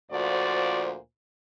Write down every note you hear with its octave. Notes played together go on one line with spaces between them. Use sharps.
D2 A#2 F3 F#4 C5 D5